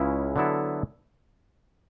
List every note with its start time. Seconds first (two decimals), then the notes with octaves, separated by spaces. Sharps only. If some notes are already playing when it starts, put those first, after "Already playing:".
Already playing: C#2 C#3 G#3 C#4 E4
0.36 D3 F#3 B3 E4 A4